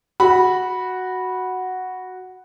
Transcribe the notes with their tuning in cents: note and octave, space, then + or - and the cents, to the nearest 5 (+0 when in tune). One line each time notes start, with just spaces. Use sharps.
F#4 +0 B5 -10